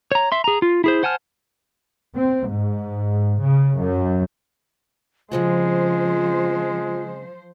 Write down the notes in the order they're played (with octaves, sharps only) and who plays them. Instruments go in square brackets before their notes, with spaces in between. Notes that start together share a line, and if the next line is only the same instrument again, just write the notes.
[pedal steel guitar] C#5 A#5
E5 C6
G#4 A#5
F4
E4 G#4 C5
C5 F#5 G#5 A5 F6
[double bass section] C4
G#2
C#3
F#2
[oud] C#3 C4 F#4 [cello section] F3 C5 [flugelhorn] G#3 [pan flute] F4